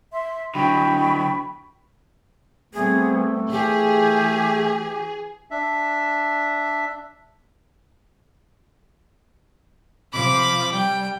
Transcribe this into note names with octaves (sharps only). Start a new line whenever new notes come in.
E5 C6
D3 F#3 G5 B5 C#6
G3 A3 B3 C4 G#4
E3 G4 G#4
D4 E5
C3 F3 B5 D6
G3 G5